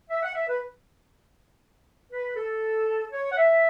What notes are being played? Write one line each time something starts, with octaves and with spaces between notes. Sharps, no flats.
E5
F#5
E5
B4
B4
A4
C#5
F#5
E5